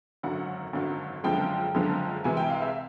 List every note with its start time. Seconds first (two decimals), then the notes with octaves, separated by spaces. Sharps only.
0.23 G#1 F#2 D3 F#3 F#5
0.73 G#1 F#2 D3 F#3
1.24 F#1 F#2 D3 F3 G#3 G5
1.74 F#1 F#2 D3 F3 G#3
2.24 C2 C3 E3 G#3 G#5
2.37 G5
2.50 F5
2.62 E5